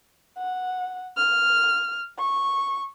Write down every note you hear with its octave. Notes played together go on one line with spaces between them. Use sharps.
F#5
F6
C#6